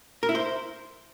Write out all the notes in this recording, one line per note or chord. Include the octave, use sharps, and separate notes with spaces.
A#4
E4
C5